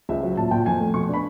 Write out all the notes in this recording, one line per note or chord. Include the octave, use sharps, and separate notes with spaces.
C#2 E5
F#3
A#2 A5
A#2 G5
F2 G#5
A3
B2 C#6
D4
B5